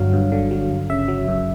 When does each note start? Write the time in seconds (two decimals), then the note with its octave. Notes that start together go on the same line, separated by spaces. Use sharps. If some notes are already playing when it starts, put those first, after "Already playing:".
Already playing: G1 G2 D3 F#3 F5
0.13 G2
0.32 D3
0.51 F#3
0.70 G1
0.90 C#3 E5
1.08 F#3
1.28 F#2